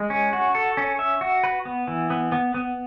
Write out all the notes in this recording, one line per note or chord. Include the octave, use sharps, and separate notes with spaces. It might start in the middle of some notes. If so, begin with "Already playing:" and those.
Already playing: G#3
C#4
F#4
A4
C#4
E5
F#4
B4
B3
E3
B3
B3
B3